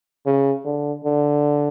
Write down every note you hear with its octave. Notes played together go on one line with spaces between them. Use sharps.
C#3
D3
D3